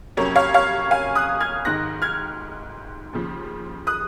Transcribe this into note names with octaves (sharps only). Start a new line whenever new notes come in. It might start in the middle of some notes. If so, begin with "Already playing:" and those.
F2 C3 F#3 A#3 C#4 C#5
C#5 F5
C#5 F5
F5 G#5
D#6 F#6
F6 G#6
G#1 G#2 D#3 F#6 A#6
F6 G#6
D#2 C#3 F3
D#6 F#6